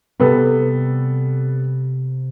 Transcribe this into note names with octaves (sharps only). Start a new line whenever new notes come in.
C3 G3 B3 A4